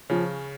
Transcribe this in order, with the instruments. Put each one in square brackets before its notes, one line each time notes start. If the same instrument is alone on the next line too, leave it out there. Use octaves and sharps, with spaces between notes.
[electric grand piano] C#3 C#4 [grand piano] F3